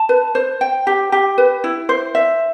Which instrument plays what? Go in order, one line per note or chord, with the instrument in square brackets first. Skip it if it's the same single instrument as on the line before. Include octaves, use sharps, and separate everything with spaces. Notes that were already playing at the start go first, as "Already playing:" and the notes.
Already playing: [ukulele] A5
B4
C5
G5
G4
G4
B4
E4
C5
E5